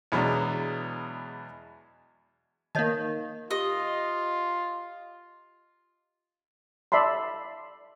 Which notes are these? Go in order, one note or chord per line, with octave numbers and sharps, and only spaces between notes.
E2 B2 F#3 G#3 D4
D#3 A#3 C#5 D#5 A5
F4 G4 D#5
D5 E5 A5 B5 C6